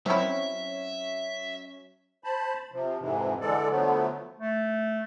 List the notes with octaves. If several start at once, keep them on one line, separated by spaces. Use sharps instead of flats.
F#3 C4 C#4 E4 C#5 E5
C5 A5 B5
C3 F3
F2 G#2 C3 E3
D3 E3 G#3 A4 D5
D3 F3 F#3 A3 B3
A3